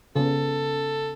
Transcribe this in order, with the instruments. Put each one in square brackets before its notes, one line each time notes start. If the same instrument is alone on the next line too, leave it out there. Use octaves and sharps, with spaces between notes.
[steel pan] C#3 B3 [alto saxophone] A4